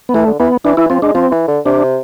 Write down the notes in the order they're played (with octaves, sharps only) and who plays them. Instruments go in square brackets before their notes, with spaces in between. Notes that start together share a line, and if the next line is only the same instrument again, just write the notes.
[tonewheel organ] B3
[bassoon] E3 [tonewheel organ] A3
[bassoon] D3
[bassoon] E3 [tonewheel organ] B3
[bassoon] E3 [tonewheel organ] D4
[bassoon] E3 [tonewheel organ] E4
[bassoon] F3 [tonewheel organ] C4
[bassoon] G#3 [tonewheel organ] D4
[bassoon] F3 [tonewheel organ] C4
[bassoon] E3
D3
[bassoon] C3 [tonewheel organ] D4